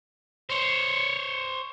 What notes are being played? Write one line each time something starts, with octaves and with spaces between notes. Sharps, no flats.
C5 C#5